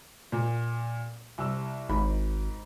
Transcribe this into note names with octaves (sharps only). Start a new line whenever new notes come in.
A#2
C2 E6
G#1 G#2 B5